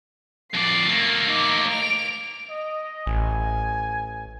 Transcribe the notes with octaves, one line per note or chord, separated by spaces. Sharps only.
F2 D5 C7
A3 A#3
D#4 D6
D7 F7
D#5
A1 G#5